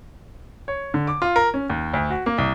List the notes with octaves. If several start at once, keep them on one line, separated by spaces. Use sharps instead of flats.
C#5
D3
D6
F4
A#4
C#4
D#2
D2
F#4
A#3
C2